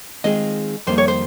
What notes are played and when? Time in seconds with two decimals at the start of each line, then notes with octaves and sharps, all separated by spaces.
0.24 D#3 G#3 C4 F4 G#4 D#5
0.87 F2 D#3 G3 A#3 D#4 C5
0.98 C#5
1.08 C5